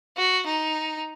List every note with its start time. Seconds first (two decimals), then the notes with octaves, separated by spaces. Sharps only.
0.17 F#4
0.46 D#4